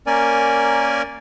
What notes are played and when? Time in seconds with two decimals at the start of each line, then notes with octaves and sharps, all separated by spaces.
0.07 A#3 C#4 A#4 D5 G#5